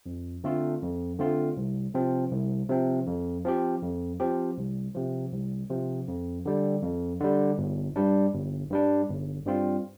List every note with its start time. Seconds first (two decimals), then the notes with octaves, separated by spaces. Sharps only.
0.06 F2
0.44 D3 A3 C4 F4
0.82 F2
1.19 D3 A3 C4 F4
1.57 C2
1.94 C3 F3 C4
2.32 C2
2.69 C3 F3 C4
3.07 F2
3.45 F3 C4 G4
3.82 F2
4.20 F3 C4 G4
4.57 C2
4.95 C3 F3
5.33 C2
5.70 C3 F3
6.08 F2
6.45 D3 G3
6.82 F2
7.20 D3 G3
7.58 G1
7.96 G2 G3 D4
8.33 G1
8.70 G2 G3 D4
9.08 G1
9.46 G2 G3 C4 F4